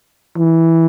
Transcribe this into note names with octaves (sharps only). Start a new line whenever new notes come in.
E3